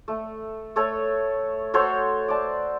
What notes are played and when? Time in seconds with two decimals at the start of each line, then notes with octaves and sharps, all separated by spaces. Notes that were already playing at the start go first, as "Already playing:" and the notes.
0.08 A3
0.76 A3 A4 C#5
1.74 F#4 A4 C5 C#5
2.28 D5 A5